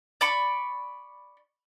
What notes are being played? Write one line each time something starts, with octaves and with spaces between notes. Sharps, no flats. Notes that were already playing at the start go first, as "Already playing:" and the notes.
D5 B5 C#6